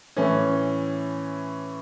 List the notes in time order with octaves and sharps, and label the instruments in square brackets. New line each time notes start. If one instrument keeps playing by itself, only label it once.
[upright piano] A2 E3 C#4